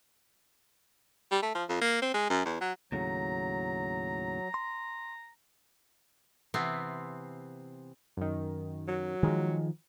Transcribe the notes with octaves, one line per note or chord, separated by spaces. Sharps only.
G3
A3
F3
F2
A#3
C4
G#3
F#2
E2
F#3
D#2 A2 C#3 F#3 A#5
C6
C3 E3 B3 C4
F#2 D#3
F#3
D#3 F3 G#3